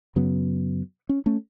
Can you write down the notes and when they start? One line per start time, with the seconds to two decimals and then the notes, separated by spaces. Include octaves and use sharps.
0.16 F#2 C#3 F#3 B3
1.09 C#4
1.26 A3 C#4